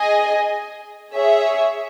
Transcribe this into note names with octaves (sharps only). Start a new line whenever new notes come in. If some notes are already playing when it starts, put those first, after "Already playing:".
Already playing: G#4 D#5 G#5
G#4 C#5 E5